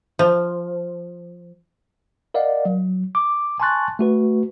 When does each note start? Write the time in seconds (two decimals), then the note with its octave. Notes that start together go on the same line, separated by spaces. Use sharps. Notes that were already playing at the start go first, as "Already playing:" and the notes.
0.19 F3
2.34 A#4 D5 D#5 F5 F#5
2.65 F#3
3.15 D6
3.60 G#5 A5 C6 C#6 F#6 A6
3.99 A3 F#4 B4